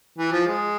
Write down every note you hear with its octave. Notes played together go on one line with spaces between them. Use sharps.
E3
F3
G#3